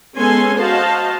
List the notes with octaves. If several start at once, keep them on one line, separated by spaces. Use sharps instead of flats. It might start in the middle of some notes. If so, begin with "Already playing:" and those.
G#3 B3 C#4 A4 G#5 C6
F#4 C5 D#5 F5 A5